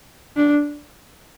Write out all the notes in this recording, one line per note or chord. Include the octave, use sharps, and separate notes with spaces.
D4